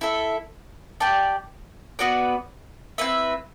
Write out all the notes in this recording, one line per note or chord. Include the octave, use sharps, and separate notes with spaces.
E4 A4 E5
G4 D5 A5
B3 F#4 B4 D5
C4 E4 B4 E5